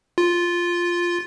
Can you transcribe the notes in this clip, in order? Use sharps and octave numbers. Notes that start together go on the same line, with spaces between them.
F4